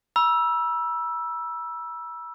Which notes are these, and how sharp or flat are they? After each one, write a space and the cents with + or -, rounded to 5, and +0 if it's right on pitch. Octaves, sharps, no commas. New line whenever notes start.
B5 -45 E6 +5